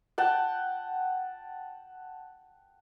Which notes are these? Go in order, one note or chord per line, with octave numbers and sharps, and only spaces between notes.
F#5 G5 A5